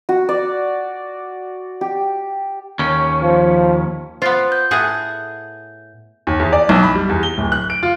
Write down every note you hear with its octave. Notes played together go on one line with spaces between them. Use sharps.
F#4
D5
G4
D#2 C#4
F3
B3 F4 C5
G6
A2 G#4 F#5
D#2
E2
D5
B1
B5
G3
E2
G7
D1
F#6
D7
F4